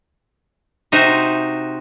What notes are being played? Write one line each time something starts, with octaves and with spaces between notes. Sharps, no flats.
C3 D#4 F#4 C5 E5